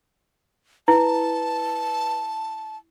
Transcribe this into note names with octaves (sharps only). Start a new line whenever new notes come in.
E4 B4 A5